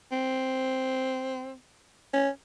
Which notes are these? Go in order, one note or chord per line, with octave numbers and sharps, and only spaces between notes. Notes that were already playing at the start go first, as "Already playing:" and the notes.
C4
C#4